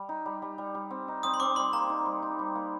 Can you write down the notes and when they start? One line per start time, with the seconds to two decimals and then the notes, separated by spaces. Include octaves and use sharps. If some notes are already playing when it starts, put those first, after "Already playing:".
Already playing: G3
0.09 D#4
0.26 G3
0.42 G3
0.58 G3
0.75 G3
0.91 C4
1.08 D#4
1.23 C4 D#6
1.34 C6
1.40 C4 D6
1.56 G3 C6
1.73 A#3 A#5
1.90 D#4
2.06 G3
2.22 D#4
2.39 G3
2.55 A#3